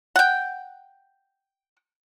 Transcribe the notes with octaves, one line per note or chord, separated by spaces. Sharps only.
F#5 G5